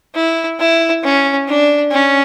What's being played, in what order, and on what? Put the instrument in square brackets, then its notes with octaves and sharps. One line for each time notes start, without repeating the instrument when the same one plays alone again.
[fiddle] E4
E4
C#4
D4
C#4